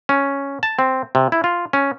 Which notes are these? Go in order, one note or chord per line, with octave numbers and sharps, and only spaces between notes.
C#4
A5
C4
C3
E4
F4
C#4